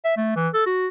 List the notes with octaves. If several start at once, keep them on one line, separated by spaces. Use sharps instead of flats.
E5
A3
E3
A4
F#4